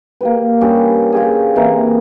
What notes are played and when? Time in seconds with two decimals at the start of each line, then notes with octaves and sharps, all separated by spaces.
0.21 A#3 G4 B4
0.61 G3 C#4 D4 G4
1.12 F4 G4 G#4
1.56 C3 E3 A#3 A#5